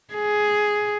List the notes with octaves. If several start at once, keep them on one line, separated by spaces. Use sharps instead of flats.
G#4